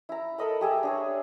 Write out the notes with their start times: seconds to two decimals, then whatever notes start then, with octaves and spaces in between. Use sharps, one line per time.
0.09 E4 A#5
0.38 A4 A#4 D#5 B5
0.61 G4 G#4 E5
0.83 D4 G#4 C#5